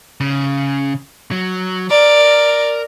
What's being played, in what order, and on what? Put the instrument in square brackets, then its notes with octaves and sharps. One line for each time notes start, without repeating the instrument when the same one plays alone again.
[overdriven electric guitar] C#3
F#3
[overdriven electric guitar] A#4 A#5 [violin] D5